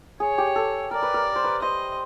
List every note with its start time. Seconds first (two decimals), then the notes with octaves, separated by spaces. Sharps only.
0.20 G#4 C#5
0.38 G4
0.56 A4
0.91 A#4 D5
1.02 B4
1.14 A#4
1.36 C5
1.44 B4
1.62 C5 D#5